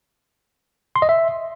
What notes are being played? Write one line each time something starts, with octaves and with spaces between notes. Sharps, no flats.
C6
D#5
E5